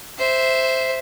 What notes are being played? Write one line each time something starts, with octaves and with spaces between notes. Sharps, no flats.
C5 E5